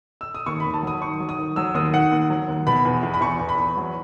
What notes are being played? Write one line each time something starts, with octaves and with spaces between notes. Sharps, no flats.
E6
D#6
D#2 C#6
B5
D#2
A5
F#3 D#6
D#3 C#6
F#3
D#6
D#3
F#3 E6
D#2 D#6
D#3 F#5
D#2
F#3
D#2
B2 B5
E2
E2
B5
E2 C#6
E2
B5
E2
F#3